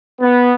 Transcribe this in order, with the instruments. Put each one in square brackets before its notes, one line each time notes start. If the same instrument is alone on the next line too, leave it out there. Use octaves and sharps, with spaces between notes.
[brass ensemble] B3